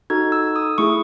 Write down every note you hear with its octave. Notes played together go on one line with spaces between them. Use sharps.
D#4 F#4 A4 G#6
E6
D#6
A3 E4 G#4 C#6